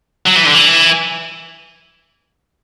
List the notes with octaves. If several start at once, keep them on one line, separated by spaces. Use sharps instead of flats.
F#3
E3
D3
E3